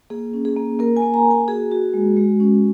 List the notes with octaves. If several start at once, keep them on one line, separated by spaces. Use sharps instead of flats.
A#3 G#4
C#4
G#4
A#3
A#3 A#4
G#5
A#3
A#5
A#3
G#5
F#4 G#4
F#4
G#3
G#3
C#4